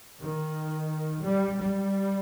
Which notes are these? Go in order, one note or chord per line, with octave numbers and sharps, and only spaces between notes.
D#3
G3
G3